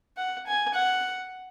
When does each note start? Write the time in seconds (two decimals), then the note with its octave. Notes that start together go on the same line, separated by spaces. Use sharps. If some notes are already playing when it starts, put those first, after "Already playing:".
0.17 F#5
0.47 G#5
0.74 F#5